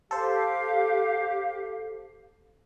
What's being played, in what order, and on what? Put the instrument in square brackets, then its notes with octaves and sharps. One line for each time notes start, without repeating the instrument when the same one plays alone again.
[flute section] G4 F5 [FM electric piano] A4 C5